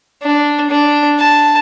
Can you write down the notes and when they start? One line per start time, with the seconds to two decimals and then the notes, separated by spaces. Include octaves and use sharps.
0.22 D4
0.70 D4
1.19 A5